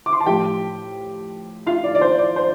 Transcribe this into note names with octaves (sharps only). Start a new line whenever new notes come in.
D6
C6
A5
A2 F3 G4 G5
F4 F5
D5
D5
C5
D5
C5